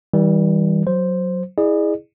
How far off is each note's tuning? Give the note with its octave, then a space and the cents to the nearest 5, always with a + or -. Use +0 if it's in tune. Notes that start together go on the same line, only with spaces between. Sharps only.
E3 -40 G3 +0
F#3 +0 C5 +0
E4 -15 G#4 -5 D5 +40